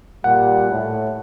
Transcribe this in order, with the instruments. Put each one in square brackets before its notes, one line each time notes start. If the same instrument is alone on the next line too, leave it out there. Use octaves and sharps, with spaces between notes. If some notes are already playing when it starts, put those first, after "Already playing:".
[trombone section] A#2 G3 [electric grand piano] F#5
[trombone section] A2